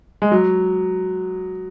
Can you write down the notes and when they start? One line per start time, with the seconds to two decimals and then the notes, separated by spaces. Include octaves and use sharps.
0.22 G#3
0.32 F#3